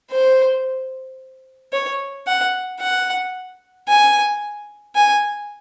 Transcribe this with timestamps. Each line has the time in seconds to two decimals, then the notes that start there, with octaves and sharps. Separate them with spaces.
0.11 C5
1.73 C#5
2.27 F#5
2.80 F#5
3.88 G#5
4.95 G#5